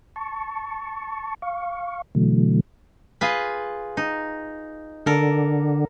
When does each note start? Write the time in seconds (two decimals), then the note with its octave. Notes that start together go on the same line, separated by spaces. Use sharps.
0.16 A5 C#6
1.42 F5 C#6
2.15 B2 D3 E3 F#3 A3
3.21 F4 G#4 B4
3.97 D#4
5.06 D3 A4 A#4